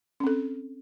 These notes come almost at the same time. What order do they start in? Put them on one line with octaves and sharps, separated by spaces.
C#4 C4 A4